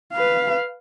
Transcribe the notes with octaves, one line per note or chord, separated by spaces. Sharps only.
B4 F5